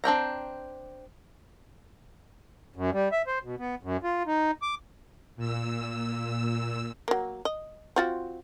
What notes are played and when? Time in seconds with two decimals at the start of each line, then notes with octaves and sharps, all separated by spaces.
0.04 C4 D4 G5 A#5
2.76 F#2
2.93 G3
3.12 E5
3.27 C5
3.43 B2
3.58 B3
3.83 F#2
4.04 F4
4.27 D#4
4.62 D6
5.36 A#2 E6
7.08 F#3 A#3
7.45 D#5
7.96 C4 F4 F#4